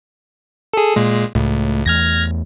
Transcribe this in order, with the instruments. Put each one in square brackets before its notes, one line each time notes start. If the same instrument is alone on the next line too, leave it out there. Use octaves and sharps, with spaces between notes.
[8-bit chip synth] G#4 A4
A#2 G#3
[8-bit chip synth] C#2 [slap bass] A2
[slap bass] E2 A3 [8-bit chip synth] F6 G#6 A#6